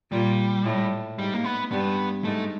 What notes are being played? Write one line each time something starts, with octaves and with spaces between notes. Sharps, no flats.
A#2 G3
A2
G#2 G3
A#3
B3
G2 B3
G#2 A3